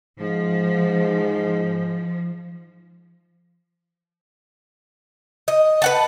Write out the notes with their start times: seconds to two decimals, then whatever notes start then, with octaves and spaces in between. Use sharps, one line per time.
0.19 G#2 F3
5.48 D#5
5.82 B4 F#5 A5